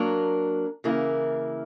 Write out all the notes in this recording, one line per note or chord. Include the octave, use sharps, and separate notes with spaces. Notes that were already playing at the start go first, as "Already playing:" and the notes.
Already playing: F#3 A#3 D4 A#4
C#3 E3 A#3 E4 A#4